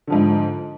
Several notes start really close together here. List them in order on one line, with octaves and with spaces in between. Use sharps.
D3 F3 G#2